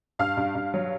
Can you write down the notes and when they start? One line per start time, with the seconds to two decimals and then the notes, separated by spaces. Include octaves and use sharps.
0.19 G2 F5 F6
0.37 G2
0.55 G2
0.74 F#3